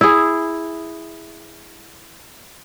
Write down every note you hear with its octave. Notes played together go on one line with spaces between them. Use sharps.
E4 G#4